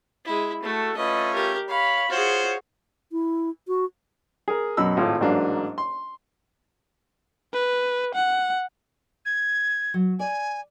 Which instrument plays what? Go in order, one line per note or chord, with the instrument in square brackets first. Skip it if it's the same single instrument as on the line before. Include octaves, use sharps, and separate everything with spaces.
[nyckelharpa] G#3 E4
[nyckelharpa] A3 [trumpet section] F#4 A4
[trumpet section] A3 C#4 F4 [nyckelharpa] B4 D#5
[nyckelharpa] G4 A#4
[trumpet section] C#5 B5 [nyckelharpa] F5
[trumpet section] F4 C5 C#5 [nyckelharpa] F#4 G#4
[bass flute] E4
F#4
[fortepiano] G#4 A#4
F#2 B2 B5 E6
G#1 A2 F4
A1 G#2 F#3 A#3 D4 F5
C6
[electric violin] B4
F#5
[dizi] G#6
[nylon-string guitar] F#3
[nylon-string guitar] D5 [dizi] G#5